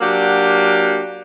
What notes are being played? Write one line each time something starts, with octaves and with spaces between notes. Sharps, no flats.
F#3 A#3 D4 F#4 G4